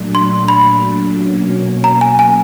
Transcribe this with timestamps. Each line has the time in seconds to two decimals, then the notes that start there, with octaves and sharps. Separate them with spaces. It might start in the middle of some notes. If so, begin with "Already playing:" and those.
Already playing: A#2 F#3 A3 D4
0.15 C6
0.48 B5
1.16 B2 F#3 A#3 C#4
1.84 A#5
2.01 G#5
2.19 G#5